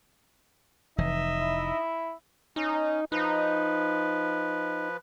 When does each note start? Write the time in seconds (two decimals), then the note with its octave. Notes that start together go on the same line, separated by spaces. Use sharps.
0.98 F1 E3 D#4 D#5 E5
1.39 E4
2.56 C#4 D#4
3.12 F3 D#4 B4